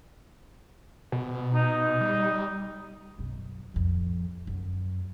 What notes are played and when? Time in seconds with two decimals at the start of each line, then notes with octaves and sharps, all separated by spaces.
1.12 B2
1.55 D#4
2.01 G3
3.18 F#2 B2
3.74 A1 F2
4.47 F#2